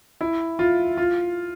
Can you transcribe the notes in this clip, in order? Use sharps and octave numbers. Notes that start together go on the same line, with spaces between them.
E4
F4
F4